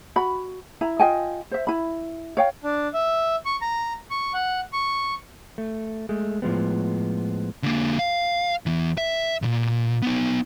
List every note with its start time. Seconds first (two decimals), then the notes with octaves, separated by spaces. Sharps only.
0.16 F#4 B5
0.81 E4 A#5
0.99 F4 D#5 G5 G#5
1.51 C5 E5
1.67 E4 B5
2.37 C#5 F5 G5
2.64 D4
2.94 E5
3.45 C#6
3.62 A#5
4.11 C#6
4.34 F#5
4.73 C#6
5.58 A3
6.09 G#3 A3
6.42 A2 F3 G#3 B3
7.63 D3 A#3
7.99 F5
8.66 E2 E3
8.98 E5
9.42 B1 A#2
10.02 B3 D#4